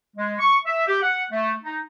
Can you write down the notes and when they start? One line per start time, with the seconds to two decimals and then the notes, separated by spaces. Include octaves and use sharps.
0.17 G#3
0.39 C#6
0.65 E5
0.87 G4
1.02 F#5
1.31 A3
1.64 D#4